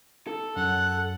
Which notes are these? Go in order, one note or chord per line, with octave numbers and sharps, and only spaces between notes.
A4
F#2 F#5